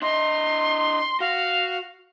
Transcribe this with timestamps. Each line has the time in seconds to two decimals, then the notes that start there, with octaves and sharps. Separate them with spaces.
0.02 D4 D#5 C6
1.20 F#4 F5